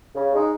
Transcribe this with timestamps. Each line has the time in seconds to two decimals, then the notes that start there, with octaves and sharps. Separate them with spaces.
0.15 C#3
0.32 G#3 D#4